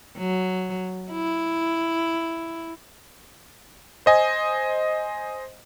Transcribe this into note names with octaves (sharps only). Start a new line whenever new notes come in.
F#3
E4
C5 D#5 G#5